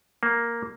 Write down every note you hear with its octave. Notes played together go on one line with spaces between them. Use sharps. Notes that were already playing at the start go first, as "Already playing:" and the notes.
A#3